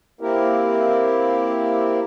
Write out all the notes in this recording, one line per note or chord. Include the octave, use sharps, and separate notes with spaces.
A#3 C4 E4 G4 A#4